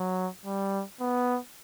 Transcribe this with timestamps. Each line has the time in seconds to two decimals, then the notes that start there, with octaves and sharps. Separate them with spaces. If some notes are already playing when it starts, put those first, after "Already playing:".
Already playing: F#3
0.45 G3
1.00 B3